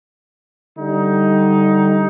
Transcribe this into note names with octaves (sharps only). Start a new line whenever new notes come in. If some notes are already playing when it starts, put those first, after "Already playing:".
D3 G3 D#4